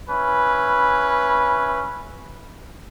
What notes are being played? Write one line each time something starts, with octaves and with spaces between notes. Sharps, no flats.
C#4 E4 B4